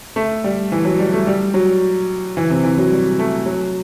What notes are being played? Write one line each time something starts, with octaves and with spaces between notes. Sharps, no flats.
A3
G3
E3
F#3
G3
A3
G3
F#3
E3
C3
E3
F#3
G3
A3
F#3